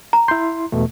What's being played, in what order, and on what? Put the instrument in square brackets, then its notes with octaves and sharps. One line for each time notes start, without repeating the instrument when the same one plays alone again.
[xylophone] A#5
[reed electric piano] E4 C6 [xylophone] G6
[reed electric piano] E2 B2 A3